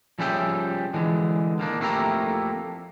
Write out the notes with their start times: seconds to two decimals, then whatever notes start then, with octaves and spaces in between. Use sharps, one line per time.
0.19 F3 G3 C#4 G#4 E5 G5
0.94 D3 E3 G#3
1.59 D#3 A#3 D4
1.80 F2 A3 A#3 E4 G4 A#5